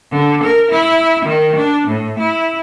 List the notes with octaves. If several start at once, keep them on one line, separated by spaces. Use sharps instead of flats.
D3
A#4
E4
D#3
D4
A2
E4